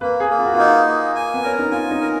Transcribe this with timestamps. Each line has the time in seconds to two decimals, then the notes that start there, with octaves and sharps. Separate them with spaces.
0.01 A#3 B4
0.20 G#4
0.29 A#3
0.39 F4
0.46 F#4
0.54 D#4 F4
0.86 A#3
1.15 G#5
1.34 B3
1.43 C#4 A#4
1.59 D#4
1.71 F4 G#5
1.91 D#4
2.01 A#4